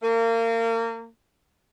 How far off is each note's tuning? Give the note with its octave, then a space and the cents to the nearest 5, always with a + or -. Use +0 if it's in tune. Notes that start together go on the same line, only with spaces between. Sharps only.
A#3 -30